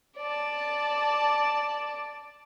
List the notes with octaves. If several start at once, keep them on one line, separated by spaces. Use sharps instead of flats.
D5 A5